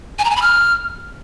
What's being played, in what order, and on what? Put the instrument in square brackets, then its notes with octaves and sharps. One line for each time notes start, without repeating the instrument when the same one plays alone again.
[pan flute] G#5
A#5
G#5
B5
F6